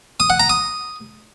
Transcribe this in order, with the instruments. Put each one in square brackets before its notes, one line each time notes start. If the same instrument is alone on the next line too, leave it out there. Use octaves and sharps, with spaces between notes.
[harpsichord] D#6
F#5
A#5
D#6